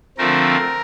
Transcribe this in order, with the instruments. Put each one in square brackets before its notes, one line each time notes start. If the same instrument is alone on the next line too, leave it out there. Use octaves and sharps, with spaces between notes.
[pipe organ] D3 F3 A3 C4 A#4